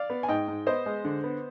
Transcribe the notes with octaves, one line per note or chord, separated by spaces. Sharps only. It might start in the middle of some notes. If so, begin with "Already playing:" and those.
Already playing: D5 F5
B3
G#5
G#2 D#5 G5
G#2
B3 C5 D#5
G#3
D3
B3